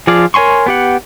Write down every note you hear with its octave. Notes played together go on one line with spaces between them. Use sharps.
F3 F4 G#4 D5 F5
A#4 C#5 G#5 C6 C#6
B3 G4 F#5